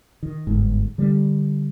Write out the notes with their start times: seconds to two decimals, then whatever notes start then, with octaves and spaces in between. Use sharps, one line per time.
0.23 D#3
0.47 G1 G#2
0.98 D3 G3